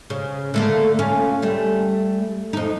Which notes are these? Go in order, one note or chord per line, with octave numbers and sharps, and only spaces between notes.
C#3
D3 A3 A#3
C#4 F4
G3 A3
F2 D#4